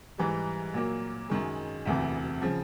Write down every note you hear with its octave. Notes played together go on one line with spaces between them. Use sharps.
G#2 E3 G3
A#2 F#3 A#3
F#2 D#3 G#3
E1 D2 C3 E3
C#3 F3